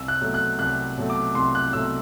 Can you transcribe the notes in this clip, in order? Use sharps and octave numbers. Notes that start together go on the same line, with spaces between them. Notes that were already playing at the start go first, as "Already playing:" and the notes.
Already playing: C2 E6
F#6
B2 F#3 A3
F#6
C2 F#6
B2 F#3 A3
D6
C2 C6
F#6
B2 F#3 A3 E6